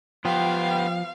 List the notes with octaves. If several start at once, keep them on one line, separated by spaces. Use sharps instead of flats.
F3 B3 G4 F5 G5